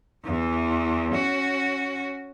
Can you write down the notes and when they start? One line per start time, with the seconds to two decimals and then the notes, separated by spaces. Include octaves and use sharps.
0.25 E2 E3
1.12 C#4 F#4